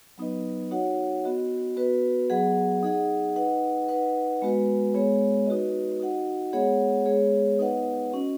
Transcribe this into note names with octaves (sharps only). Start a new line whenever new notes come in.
F#3 B3 D#4 B4 D#5
D#4 F#4 C#5 F#5
B3 F#4 D#5
B3 F#4 B4
F#3 B3 G#4 D#5 F#5
D#4 G#4 D#5 F#5
D#4 B4 D#5 F#5
D#4 B4 D#5 F#5
G#3 B3 F#4 B4
G#3 B3 G#4 C#5
D#4 F#4 B4 D#5
D#4 F#4 D#5 F#5
G#3 B3 G#4 C#5 F#5
G#3 B3 G#4 C#5
B3 D#4 B4 D#5 F#5
C#4 F#4 D#5